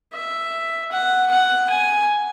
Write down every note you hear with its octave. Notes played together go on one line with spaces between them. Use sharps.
E5
F#5
F#5
G#5